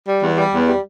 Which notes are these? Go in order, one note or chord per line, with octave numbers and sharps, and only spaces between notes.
G3
E2
G3
E2
G3